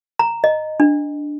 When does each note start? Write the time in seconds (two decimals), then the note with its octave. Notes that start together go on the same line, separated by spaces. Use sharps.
0.19 A#5
0.44 D#5
0.80 D4